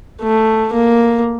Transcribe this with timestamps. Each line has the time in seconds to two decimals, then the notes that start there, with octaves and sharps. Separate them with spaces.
0.22 A3
0.74 A#3